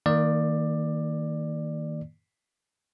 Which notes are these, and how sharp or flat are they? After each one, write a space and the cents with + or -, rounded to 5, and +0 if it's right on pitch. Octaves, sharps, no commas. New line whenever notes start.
D#3 +20 A#3 -20 D5 +15